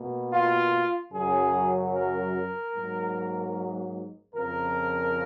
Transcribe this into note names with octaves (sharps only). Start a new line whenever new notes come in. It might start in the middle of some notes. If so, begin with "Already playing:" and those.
Already playing: B2 A#3
F4
F#2 C#3 F#3 G#4
A#4
G#2 F#3 A#3
F2 C#3 F3 A#4